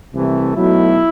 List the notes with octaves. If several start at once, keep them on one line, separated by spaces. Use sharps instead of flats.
C2 C3 E3 A3
B1 B2 F#3 A3 E4